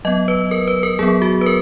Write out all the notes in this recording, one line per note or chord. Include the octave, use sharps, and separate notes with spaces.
F#3 B3 D#5
B4
A#4
B4
A#4
F#3 B3 G#4
F#4
B4
A#4